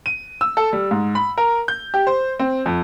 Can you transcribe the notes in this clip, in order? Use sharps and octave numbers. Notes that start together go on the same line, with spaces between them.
D#7
E6
A4
G3
G#2
B5
A#4
G6
G4
C5
C4
F2